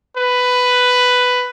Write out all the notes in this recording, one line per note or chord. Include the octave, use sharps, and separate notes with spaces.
B4